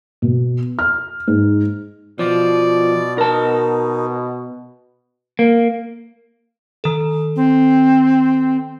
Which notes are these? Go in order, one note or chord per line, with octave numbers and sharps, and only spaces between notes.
B2
F6
G#2
B2 F3 D5
D#4 A#4 A5
A#3
D#3 A4
C4